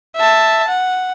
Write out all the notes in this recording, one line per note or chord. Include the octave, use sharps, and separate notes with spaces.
E5 A5
F#5